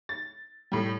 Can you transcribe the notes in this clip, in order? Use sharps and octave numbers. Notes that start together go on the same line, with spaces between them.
A6
A2 G3